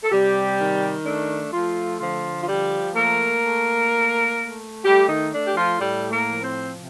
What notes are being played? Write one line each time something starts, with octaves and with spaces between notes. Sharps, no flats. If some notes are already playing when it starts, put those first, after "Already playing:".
A4
C3 G3 G4
D#3
A3 D4
F3 A3 F4
D3 F3 F4
F4
F3 G3 G4
A3 A#3 A#4
A3
A3
A3
G3 A3 G4
D#3 D#4
A3 D4
G4
F3 F4
A2 G3 G4
A#3 A#4
F3
C4 C5
C3